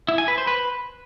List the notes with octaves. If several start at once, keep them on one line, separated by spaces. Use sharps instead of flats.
E4
G#5
B4
C5
B4